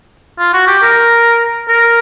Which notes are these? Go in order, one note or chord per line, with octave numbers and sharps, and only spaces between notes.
F4
F#4
G4
A#4
A#4